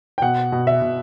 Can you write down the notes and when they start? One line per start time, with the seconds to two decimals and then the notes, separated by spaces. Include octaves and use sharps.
0.18 G5
0.22 B2 F#5
0.52 B2
0.67 E5
0.82 B2